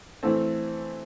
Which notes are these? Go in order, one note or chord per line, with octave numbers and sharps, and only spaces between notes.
E3 A3 C4